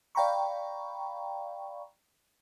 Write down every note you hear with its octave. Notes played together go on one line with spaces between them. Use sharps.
D5 F5 G5 A#5 B5 C#6